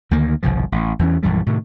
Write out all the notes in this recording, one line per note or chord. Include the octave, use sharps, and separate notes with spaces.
D2 D#3 A#3
G1 C2 B2 F3
A1
E2 E3 C#4
A#1 F#2 E3 G3
A2 C3 D#3